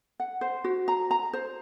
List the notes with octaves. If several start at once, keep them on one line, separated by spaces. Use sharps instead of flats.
F#5
C5
F#4
A#5
A#5
C5